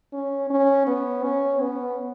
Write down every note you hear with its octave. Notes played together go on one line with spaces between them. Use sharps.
C#4
C#4
B3
C#4
B3